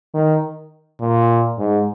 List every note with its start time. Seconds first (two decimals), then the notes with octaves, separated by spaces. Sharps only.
0.14 D#3
1.00 A#2
1.58 G#2